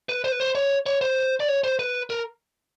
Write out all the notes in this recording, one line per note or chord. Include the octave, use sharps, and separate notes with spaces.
B4
C5
B4
C5
C#5
C#5
C5
D5
C#5
C5
B4
A#4